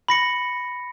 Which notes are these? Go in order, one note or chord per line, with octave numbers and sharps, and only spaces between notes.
B5 A#6 C#7